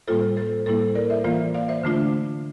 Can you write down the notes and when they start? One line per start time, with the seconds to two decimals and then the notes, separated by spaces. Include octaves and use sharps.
0.07 A2 G3 A#3 F4 A4 C5
0.37 A4 C5
0.66 A2 G3 A#3 E4 A4 C5
0.95 A#4 D5
1.10 C5 E5
1.24 E3 A#3 F4 D5 F5
1.54 D5 F5
1.68 C5 E5
1.83 D3 A3 D4 F4